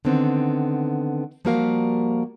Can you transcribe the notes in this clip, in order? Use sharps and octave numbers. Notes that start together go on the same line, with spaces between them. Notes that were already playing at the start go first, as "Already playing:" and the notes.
D3 D#3 B3 C4
F3 G3 A#3 F#4 A#4 F5